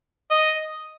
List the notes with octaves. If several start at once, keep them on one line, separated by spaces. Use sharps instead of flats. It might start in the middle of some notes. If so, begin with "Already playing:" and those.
D#5